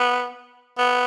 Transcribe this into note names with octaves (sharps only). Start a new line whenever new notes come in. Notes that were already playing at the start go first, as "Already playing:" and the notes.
Already playing: B3
B3